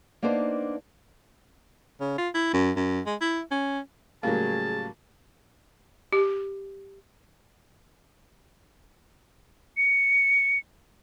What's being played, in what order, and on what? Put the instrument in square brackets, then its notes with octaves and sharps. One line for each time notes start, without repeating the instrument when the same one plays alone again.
[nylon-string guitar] A#3 B3 D4 D#4 C5
[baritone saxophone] C#3
F4
E4
F#2
F#2
G#3
E4
C#4
[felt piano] A2 C#3 G3 [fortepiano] F#3 A#3 [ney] G#4 [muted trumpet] A5
[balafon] G4
[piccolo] C#7